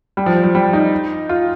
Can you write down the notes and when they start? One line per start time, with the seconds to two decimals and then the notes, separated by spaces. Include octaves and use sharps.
0.17 G3
0.26 F3
0.44 F3
0.55 G3
0.73 D#4
1.29 F4